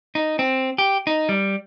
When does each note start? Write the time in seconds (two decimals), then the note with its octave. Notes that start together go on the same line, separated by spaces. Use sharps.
0.15 D#4
0.39 C4
0.78 G4
1.07 D#4
1.29 G3